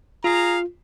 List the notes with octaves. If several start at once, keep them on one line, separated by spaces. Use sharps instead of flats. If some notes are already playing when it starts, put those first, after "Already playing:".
F4 G#4 F5 A#5